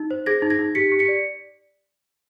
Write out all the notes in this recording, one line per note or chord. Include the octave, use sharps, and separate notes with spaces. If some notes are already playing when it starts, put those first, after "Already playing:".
Already playing: D#4
C5
G#4 G#6 A#6
D#4
G#6 A#6
D#4
G4 B6 C#7
G4
B6 C#7
D5